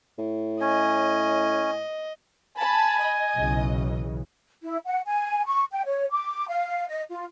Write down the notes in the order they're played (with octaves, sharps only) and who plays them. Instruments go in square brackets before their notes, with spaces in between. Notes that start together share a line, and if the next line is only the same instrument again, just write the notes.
[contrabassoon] A2
[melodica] C#4 G#5 [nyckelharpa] D#5
[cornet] G#5 [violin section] A5 B5
[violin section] D#5
[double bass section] B1 C#3 E3
[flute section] E4
F#5
G#5
C#6
G5
C#5
D6
F5
D#5
F4